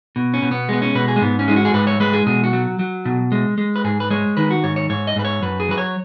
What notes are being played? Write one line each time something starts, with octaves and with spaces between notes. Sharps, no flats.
B2
C#4
B2
B3
G#3 B3
C#4
B2 B4
G#4
G#3
G#2 B3
C#4
G#3 D#4
F#4
G#4
G#2 B4
C#5
G#3 B4
G#4
B2 G#4
F#4
F#3
F#3
B2
G#3
G#3
B4
G#2 G#4
B4
G#3 C#5
D#3 B4
F#4
G#2 C#5
C#5
G#2 C#5
D#5
G#2 B4
C#5
F#2 B4
G#4
F#3 B4
C#5